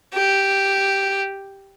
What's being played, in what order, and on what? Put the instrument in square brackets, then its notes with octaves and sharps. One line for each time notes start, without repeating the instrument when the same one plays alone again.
[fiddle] G4